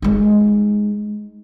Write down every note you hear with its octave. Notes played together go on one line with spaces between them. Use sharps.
G#3 D#4